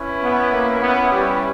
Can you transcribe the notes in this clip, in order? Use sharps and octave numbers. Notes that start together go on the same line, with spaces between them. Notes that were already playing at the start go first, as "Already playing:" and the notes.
Already playing: C#4 E4 B4
B3
A#3
B3
G3